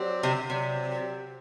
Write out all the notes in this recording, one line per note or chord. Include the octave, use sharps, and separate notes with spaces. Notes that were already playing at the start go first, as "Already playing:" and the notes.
Already playing: F#3 C4 G4 D5
C3
C3 F#3 C4 G4 D5